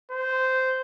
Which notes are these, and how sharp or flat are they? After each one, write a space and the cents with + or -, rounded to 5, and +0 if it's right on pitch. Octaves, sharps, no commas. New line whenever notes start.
C5 -10